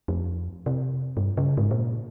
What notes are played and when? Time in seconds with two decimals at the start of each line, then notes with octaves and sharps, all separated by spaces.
0.08 F2
0.66 C3
1.17 G2
1.37 C#3
1.57 G#2
1.71 A#2